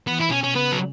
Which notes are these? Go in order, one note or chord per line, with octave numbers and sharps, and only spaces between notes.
E3 B3
E4
B2 C#4
B2 C#4
C#3 B3
F#3